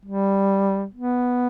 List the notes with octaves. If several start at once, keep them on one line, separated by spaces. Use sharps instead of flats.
G3
B3